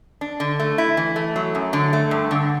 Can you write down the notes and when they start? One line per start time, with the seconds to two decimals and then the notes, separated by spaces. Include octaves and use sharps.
0.21 D4
0.40 D3
0.60 A3
0.78 E4
0.97 E3
1.16 A3
1.36 F#3
1.55 F#2
1.73 D3
1.93 A3
2.11 G2
2.31 D3